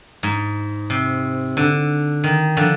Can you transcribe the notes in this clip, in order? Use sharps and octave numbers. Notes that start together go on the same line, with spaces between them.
G#2
C3
D3
D#3
D3 F3